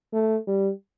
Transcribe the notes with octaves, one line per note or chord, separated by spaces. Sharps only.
A3
G3